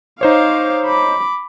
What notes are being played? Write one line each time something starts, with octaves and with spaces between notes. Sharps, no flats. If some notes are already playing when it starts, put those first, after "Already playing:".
D#4 C5 C#5 F5 D6
B5 D6